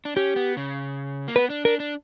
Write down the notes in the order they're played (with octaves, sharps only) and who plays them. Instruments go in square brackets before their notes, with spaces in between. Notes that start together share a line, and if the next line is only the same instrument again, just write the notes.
[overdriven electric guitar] D4
[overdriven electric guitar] C#4 [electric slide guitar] G4
[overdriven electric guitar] B3
C#3
A#3
[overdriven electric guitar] B3 [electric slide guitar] B4
[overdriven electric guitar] D4
[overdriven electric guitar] D4 [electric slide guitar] A#4
[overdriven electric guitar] D4